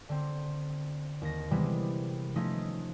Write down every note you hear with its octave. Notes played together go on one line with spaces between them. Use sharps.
D3 C4
D#2 A#6
C3 D#3 E3 G3 G#3 B3
F3 A3 C#4 D#4